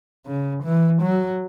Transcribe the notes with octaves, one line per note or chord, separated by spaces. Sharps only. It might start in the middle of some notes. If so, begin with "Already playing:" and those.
C#3
E3
F#3